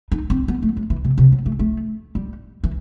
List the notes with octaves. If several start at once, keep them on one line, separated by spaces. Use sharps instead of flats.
D#4
C4
B3
A3
F#3
E3
C3
C3
F#3
A3
A3
G3
E3